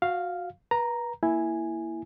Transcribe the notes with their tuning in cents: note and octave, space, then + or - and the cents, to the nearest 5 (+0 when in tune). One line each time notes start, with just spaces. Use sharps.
F#4 -20 F5 +0
B4 -30 A#5 +0
A#3 +5 E4 +0 G#5 +0